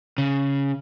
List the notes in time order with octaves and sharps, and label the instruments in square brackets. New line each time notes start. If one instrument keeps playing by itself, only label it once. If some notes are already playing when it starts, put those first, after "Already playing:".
[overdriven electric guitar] C#3